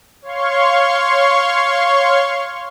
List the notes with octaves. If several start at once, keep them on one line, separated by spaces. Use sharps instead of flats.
C#5 F5 C6 C#6